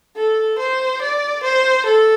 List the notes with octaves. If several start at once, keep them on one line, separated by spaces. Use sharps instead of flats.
A4
C5
D5
C5
A4